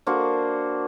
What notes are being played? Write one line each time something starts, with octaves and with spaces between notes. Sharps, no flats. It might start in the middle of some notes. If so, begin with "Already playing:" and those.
A#3 D4 F#4 C5